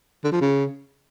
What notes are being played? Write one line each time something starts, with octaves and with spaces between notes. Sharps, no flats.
D3
F3
C#3